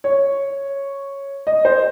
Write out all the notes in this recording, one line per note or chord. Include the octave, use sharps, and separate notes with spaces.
C#5
D#5
C5